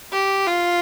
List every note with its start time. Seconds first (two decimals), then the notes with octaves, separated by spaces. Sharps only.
0.13 G4
0.47 F4